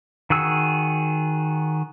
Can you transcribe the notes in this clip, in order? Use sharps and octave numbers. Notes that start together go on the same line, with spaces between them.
D#3 F#4 G#4 E6